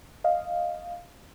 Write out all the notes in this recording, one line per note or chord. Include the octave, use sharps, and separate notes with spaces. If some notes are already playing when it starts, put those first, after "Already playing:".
D#5 F5